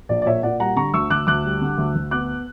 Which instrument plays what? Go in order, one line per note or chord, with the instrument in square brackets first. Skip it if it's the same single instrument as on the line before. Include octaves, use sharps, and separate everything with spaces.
[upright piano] A#1 D5
D5
A#2 C#5 E5
A#2 D5 F#5
G3 F#5 A#5
D3 A#5 C#6
D2 C#6 E6
D2 D6 F#6
D2 D6 F#6
G3
D3
D2
D2
B3 D6 F#6